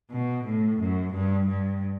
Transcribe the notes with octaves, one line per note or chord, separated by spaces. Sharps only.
B2
A2
F#2
G2
G2